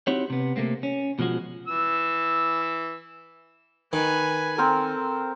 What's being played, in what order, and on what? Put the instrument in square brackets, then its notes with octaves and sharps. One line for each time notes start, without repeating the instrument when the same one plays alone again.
[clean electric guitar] C4 D#4 E4 F#4 G4 C#5
C3 B3
C3 A3 A#3 C4
C#4
B2 F3 G#3 F#4
[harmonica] E3 E6
[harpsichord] D#3 [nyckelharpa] B4 G#5
[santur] C4 A#4 [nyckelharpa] A4